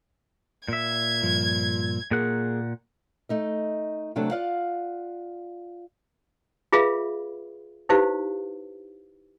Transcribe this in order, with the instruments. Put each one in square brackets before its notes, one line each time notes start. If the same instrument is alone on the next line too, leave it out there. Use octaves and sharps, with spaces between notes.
[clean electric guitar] A#2 E5 [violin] G#6
[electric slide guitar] G2 F3
[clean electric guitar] A#2 F#5 [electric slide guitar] A#3 G#4 A#4
[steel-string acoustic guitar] A3 D#4 D#5
C3 F#3 A3 D4 A4
F4 D5 F5 F#5
[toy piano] F4 G#4 B4 E5 F5 B5
D#4 E4 G4 B4 C5 F5